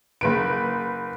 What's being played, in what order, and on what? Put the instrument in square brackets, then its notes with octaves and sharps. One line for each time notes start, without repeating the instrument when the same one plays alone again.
[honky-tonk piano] F#1 B4 D7